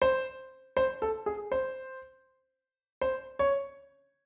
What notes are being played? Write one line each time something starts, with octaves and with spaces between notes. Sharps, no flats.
C5
C5
A4
G#4
C5
C5
C#5